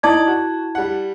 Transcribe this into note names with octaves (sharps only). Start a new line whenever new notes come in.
D#4 E4 D5 A5 G#6
F#4
G3 F#5